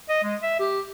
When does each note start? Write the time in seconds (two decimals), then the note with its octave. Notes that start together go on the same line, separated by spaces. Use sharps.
0.09 D#5
0.24 G#3
0.42 E5
0.60 G4